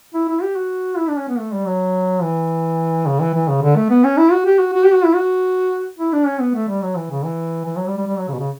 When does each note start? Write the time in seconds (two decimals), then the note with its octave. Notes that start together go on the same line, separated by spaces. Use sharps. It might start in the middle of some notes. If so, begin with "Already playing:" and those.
0.14 E4
0.29 E4
0.42 G4
0.56 F#4
0.97 E4
1.08 D4
1.18 C#4
1.29 B3
1.39 A3
1.54 G3
1.67 F#3
2.23 E3
3.07 C#3
3.20 E3
3.35 E3
3.48 C#3
3.62 D3
3.76 A3
3.90 B3
4.04 C#4
4.18 E4
4.32 F#4
4.46 G4
4.59 F#4
4.74 F#4
4.84 G4
4.94 F#4
5.05 E4
5.15 F#4
5.99 E4
6.13 D4
6.27 C#4
6.40 B3
6.55 A3
6.69 G3
6.83 F#3
6.96 E3
7.11 C#3
7.24 E3
7.66 E3
7.77 F#3
7.87 G3
7.97 G3
8.07 G3
8.18 F#3
8.28 C#3
8.34 B2
8.39 C#3